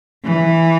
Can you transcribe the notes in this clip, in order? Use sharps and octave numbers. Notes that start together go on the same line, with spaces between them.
E3